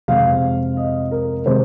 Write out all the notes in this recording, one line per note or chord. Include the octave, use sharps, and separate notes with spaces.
F2 C3 G#3 C4 F5
D#5
A#4
C3 G#3 C4 C5